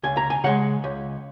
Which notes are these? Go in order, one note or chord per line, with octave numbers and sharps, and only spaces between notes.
C#2 G#5
A#5
G#5
C#3 G#3 F#5
C#2